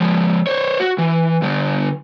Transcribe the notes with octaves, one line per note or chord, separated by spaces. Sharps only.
F3 G#3
C5 C#5
F#4
E3
D3 G3